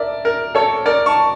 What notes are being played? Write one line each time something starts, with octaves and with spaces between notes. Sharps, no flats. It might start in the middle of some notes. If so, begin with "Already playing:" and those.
Already playing: A#4 D5 E5
A#4
A4 C#5
A#4 D5
A5 C#6